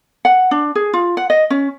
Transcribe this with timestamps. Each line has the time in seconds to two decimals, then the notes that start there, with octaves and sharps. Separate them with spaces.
0.25 F#5
0.51 D4
0.75 G#4
0.93 F4
1.17 F#5
1.30 D#5
1.50 C#4